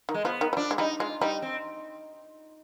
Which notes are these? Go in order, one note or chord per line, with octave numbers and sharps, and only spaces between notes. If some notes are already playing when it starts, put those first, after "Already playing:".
D#3
G#3
F3 B3
D#3
G3
F3 D4
G#3
G3 D#4
G#3 F4
G3 D#4
C4